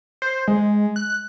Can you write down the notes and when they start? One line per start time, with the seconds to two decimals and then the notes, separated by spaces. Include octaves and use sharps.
0.22 C5
0.48 G#3
0.96 F#6